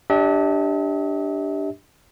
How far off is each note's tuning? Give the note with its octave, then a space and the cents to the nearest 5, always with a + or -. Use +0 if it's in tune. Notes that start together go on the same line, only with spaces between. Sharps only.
D4 +0 G4 +0 E5 -45